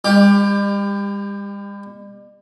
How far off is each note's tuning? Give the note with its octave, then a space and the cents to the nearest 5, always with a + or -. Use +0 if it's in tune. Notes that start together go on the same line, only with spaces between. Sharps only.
G3 +45 G4 +20